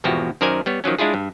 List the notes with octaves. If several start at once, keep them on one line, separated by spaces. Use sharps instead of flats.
G#1 E2 B2 F3 F#4 G4
F#2 D#3 A#4 C5 D5 G#5
G3 B3 C#5
D#3 F3 F#3 C#4
G#3 D4 E4 F4 G#4
G2